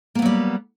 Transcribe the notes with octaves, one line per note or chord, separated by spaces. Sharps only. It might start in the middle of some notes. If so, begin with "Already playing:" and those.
F#3 G3 A#3 B3